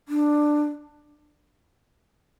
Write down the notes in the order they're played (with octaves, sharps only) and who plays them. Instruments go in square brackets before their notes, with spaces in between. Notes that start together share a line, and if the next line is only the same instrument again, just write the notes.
[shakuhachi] D4